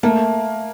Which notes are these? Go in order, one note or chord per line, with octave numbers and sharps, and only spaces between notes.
A3 A#3